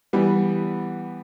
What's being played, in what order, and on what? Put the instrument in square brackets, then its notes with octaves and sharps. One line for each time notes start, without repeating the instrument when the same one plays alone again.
[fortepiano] E3 G3 B3